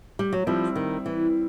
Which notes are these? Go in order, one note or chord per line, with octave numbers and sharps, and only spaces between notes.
G3
F#3
F3 G3 C4 E4
D#3
E3